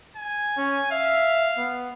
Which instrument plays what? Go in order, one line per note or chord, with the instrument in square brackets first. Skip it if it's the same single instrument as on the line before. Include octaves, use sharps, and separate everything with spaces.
[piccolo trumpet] G#5
[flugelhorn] C#4
[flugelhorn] E5 [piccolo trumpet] F5
[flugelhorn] B3